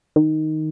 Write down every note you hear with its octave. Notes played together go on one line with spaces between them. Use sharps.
D#3